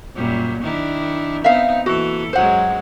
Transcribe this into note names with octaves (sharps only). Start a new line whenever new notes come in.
F#2 A#2 G3
D#3 D4 E4
B3 C4 D#4 E5 F5
E3 A#3 F#4 A4
F#2 F#3 G#3 C5 F#5